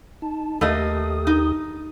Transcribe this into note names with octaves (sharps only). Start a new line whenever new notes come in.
D#4 A5
D#2 A3 A#3 G4 D#5 D#6
D#4